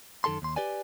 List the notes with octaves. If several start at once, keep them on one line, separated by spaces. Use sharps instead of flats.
F#2 D#3 G4 A4 A5 C6
D#2 C6
G4 B4 D5 G#5